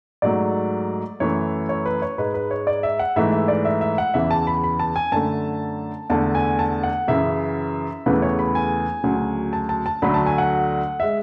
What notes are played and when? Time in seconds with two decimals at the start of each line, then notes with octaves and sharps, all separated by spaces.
0.22 G#2 F#3 A3 D5
1.20 F#2 E3 A3 C#5
1.69 C#5
1.86 B4
2.02 C#5
2.18 G#2 G#3 B4
2.34 B4
2.51 C#5
2.67 D5
2.83 E5
2.99 F#5
3.16 G#2 E3 A3 E5
3.32 E5
3.48 D5
3.65 E5
3.81 E5
3.98 F#5
4.14 E2 C#3 E3 E5
4.31 A5
4.47 B5
4.64 B5
4.80 A5
4.96 G#5
5.12 F#2 D3 A3 A5
6.10 E2 D3 A3 A5
6.35 G#5
6.59 A5
6.83 F#5
7.08 F#2 C#3 E3 E5
8.06 E2 C#3 E3 A3 B4
8.22 C#5
8.39 B5
8.55 G#5
9.04 D2 C#3 F#3
9.53 A5
9.69 A5
9.86 A5
10.02 D2 D3 F#3 A3 B5
10.14 A5
10.26 G#5
10.38 F#5
11.00 G#3 E5